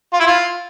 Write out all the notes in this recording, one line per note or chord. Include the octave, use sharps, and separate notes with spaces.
F4
E4
F4